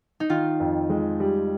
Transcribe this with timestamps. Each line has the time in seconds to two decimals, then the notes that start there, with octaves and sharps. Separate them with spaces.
0.20 D#4
0.30 D#3 F4
0.60 F2
0.90 G#3
1.20 G3